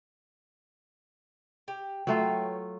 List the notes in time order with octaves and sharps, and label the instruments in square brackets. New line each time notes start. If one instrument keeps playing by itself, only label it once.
[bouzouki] G4
[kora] F#3 A3 F4 [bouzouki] B4 C#5 G5